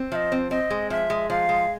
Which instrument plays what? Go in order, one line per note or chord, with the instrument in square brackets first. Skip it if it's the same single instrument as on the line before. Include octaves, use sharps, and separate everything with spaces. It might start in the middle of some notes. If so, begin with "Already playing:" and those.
Already playing: [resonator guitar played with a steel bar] C4
[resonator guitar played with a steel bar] F3 [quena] E5
[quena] D#5
[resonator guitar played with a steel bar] C4
[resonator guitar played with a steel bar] C4 [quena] D#5
[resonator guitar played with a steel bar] G#3
[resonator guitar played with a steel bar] F3 [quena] E5
[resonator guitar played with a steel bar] G#3
[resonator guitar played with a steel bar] F3 [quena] F5
[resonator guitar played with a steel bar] G#3